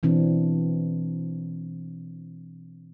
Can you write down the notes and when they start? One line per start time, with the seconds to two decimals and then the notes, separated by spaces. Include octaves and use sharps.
0.03 B2 E3 C4 D4